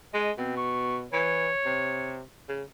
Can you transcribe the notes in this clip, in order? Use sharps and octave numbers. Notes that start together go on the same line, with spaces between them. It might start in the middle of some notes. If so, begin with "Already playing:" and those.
G#3 D#5
B2 C4
C#6
E3 C#5
C3
C#3